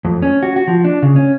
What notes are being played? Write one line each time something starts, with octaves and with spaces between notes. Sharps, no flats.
F2
C#4
F#4
F#4
F3
D4
C#3
C#4